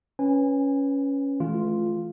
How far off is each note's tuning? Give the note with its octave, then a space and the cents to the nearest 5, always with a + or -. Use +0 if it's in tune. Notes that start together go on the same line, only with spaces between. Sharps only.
C#4 +0 B4 +0 G#5 -25
E3 +0 A3 -40 F4 +0